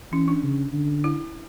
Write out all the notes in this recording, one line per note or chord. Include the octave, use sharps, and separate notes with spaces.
E3 C#4
D4
C#3
D3
E4